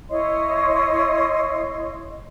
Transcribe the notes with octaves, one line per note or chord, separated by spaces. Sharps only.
E4 C#5 D#5 C6